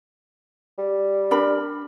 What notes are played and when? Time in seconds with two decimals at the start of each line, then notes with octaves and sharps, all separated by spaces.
0.78 G3
1.31 D4 A#4 B5